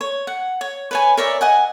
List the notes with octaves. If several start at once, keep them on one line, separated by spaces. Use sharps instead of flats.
C#5
F#5
C#5
B4 C#5 G#5
A#4 C#5 D5 E5
D#5 F#5 G#5